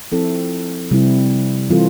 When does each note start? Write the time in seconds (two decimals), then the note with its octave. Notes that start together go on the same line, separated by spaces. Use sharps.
0.12 F3 C4 E4 A4
0.91 C3 G3 C4 E4
1.70 E3 G3 C4 F4 A4